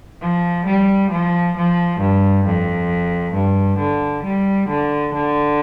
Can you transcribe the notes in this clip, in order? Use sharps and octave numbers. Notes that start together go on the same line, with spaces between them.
F3
G3
F3
F3
G2
F2
G2
D3
G3
D3
D3